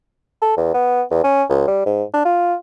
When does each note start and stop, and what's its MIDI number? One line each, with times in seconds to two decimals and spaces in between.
0.42 0.54 69
0.57 0.70 40
0.74 1.03 59
1.11 1.22 40
1.24 1.44 61
1.50 1.64 37
1.68 1.83 55
1.86 2.03 44
2.13 2.24 62
2.25 2.55 65